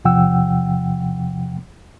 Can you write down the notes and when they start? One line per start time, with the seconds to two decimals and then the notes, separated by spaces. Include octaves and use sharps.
0.05 E2 C3 F3 F#5 G5 E6